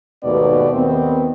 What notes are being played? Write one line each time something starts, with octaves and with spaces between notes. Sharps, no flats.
D#2 G#2 B2 A3 B3 D5
D#2 D#3 B3 C4